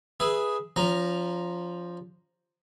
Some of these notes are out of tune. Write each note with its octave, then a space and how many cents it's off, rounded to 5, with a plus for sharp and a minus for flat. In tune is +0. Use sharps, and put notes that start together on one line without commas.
G#4 +0 B4 -10 E5 +0
F3 +0 C#4 +35 A#5 +0